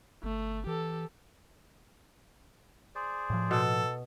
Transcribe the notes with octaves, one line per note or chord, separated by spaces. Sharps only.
G1 A3
E3 G4 A4
G#4 C5 D5
A2 F3
B2 A4